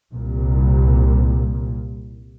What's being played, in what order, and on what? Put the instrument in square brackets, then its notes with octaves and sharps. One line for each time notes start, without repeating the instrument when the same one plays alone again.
[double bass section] C2 A#2